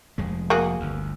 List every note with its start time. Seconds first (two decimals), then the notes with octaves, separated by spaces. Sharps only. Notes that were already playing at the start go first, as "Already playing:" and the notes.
0.18 F1 F2 G#3
0.50 A#3 F#4 G#4
0.80 G1 D2